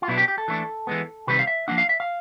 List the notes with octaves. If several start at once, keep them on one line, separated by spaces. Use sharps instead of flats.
F4
B2 F#3 B3 D4 E4
G4
G4
A4
E3 A3 D4
E3 G#3 B3
C3 D#3 G3 C4 B4
F5
E5
F3 A#3 D4 F#5
F5
E5
F5